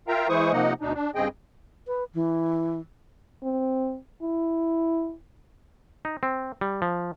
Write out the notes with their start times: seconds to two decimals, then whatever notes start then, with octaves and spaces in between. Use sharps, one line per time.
0.08 F4 A#4 E5 F5 G5 A#5
0.29 E3 G#3 E4 C5 C#6 D#6
0.52 C3 F3 A#3 D#4 D#5 F#5
0.81 D2 B2 D4 D#4
0.94 D4
1.15 G2 C#3 C4 G#4 D#5 G5
1.87 B4
2.14 E3
3.43 C4
4.22 E4
6.05 D#4
6.23 C4
6.61 G3
6.82 F3